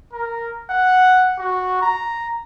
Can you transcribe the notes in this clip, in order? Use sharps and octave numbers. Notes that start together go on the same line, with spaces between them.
A#4
F#5
F#4
A#5